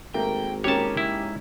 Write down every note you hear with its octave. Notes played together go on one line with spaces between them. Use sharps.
G#1 A3 A#3 G5
G#3 A#3 C#4 D#4 G4 A#4 C#5 A5
E4